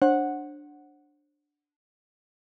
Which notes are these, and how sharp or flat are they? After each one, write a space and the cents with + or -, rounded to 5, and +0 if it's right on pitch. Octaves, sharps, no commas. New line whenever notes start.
D4 +0 C5 +40 F#5 -5